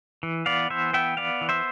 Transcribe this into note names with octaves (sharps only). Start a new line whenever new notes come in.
E3
B3 D5 F5
E3 C5 E5
B3 E5 G5
B3 D5 F5
E3
C5 E5